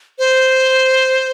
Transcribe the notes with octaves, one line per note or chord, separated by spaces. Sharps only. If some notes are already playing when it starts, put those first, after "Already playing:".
C5